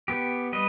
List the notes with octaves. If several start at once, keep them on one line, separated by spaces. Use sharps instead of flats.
B3 G4
G3 B4 D#5